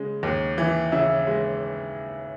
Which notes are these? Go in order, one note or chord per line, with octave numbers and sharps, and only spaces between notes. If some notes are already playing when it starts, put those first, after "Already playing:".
Already playing: C#3 G#3
D#2
E3
C#3 E4 E5
G#3